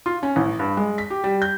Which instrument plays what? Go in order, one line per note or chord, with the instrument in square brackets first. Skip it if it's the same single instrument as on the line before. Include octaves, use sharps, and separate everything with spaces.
[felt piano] F4
C#4
A1
G2
G#3
B6
G4
G3
G6